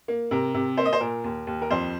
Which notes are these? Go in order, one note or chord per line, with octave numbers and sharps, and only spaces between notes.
A#3
C3 A#4
C3
A#3 C5
D#5
C5
A#2 A#4
D#2
D#2
A#4
F2 C5